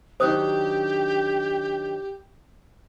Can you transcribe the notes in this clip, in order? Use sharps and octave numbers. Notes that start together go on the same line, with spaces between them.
D#3 F#3 D4 G4 C5 D#6 F#6